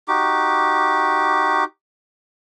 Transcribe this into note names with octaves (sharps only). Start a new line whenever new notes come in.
D#4 F#4 G4 D6